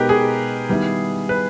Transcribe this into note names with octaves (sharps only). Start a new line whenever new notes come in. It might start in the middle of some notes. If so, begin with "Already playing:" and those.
Already playing: B2 G#3 B3 D#4 G4 A#4 B4
G#4
D#3 G3 B3 E4
B4